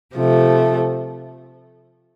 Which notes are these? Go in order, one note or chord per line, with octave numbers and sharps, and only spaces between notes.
C3 F3 A3